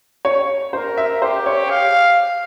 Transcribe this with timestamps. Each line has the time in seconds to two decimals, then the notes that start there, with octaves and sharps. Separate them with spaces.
0.25 C#5
0.73 A#4 C5
0.97 E5
1.22 G4 C5
1.46 C#5
1.70 F5